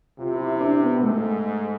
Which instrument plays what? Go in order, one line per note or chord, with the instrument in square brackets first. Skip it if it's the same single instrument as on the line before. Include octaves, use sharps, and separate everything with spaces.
[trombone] C3 [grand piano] F4
[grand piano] E4
E4
D4
B3
[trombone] G#2 [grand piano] A3